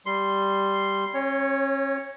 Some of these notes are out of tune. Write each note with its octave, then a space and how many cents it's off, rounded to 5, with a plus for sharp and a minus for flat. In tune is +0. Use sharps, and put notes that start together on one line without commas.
G3 +0 C6 +0
C#4 -35 C#5 +0